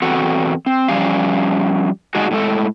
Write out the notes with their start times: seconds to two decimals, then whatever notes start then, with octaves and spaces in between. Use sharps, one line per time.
0.02 E2 C4 F#4 A4 F#5
0.66 C4
0.88 F3 G3 C#4 G4 F5
2.15 G#3 D4 D#4 F#4 G#4
2.31 A2 G#3 A4